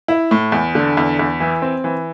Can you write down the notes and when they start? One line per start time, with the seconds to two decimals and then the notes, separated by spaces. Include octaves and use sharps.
0.08 E4
0.31 A2
0.52 E2
0.75 D3
0.97 E2
1.19 E2
1.40 E3
1.62 C4
1.84 E3